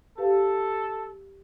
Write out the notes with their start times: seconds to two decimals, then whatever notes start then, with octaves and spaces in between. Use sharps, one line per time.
0.18 G4 A4 B4 F5